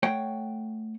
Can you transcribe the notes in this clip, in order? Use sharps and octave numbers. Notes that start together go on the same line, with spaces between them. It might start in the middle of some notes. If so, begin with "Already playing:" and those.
A3 C#5 F#5 G5